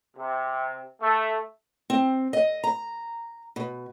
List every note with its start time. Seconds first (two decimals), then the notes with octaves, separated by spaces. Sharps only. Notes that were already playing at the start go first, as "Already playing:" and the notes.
0.17 C3
1.01 A3
1.90 C4
2.33 D#5
2.64 A#5
3.56 B2